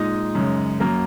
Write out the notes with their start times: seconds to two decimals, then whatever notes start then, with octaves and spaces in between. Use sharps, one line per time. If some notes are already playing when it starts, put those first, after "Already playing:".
Already playing: A#2 G#3 D#4 D#5
0.35 F#2 C#3 G#3
0.80 F#2 F#3 A#3 A#4